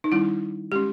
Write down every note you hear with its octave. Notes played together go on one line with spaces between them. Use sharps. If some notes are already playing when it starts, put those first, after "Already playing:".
D#4
D#3 G3 C#4 E4
G#3 C#4 G4